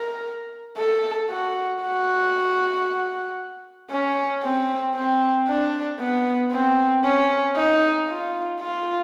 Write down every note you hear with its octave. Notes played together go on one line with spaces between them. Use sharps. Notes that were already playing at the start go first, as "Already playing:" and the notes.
Already playing: A#4
A4
F#4
F#4
C#4
C4
C4
D4
B3
C4
C#4
D#4
F4
F4